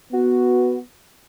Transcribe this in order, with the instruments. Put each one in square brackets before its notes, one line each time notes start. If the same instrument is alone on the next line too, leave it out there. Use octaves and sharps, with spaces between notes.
[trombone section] B3 [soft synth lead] F#4